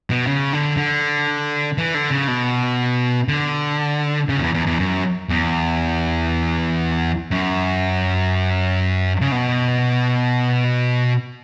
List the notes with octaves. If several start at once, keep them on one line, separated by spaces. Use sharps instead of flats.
B2
C#3
D3
D3
E3
D3
C#3
B2
D3
C#3
F#2
E2
E2
E2
F#2
E2
F#2
C#3
B2